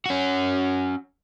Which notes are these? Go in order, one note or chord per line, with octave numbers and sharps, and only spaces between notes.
C#4 F#4